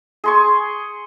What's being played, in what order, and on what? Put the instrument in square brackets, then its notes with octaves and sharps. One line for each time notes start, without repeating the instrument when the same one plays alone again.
[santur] G#4 C6 C#6